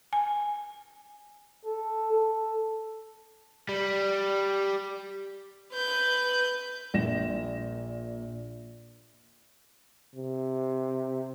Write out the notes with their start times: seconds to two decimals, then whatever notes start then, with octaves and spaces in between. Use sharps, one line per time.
0.13 G#5
1.65 A4
2.12 A4
3.69 G3
5.73 B4 G6
6.94 A#1 A#2 A#6 E7
10.16 C3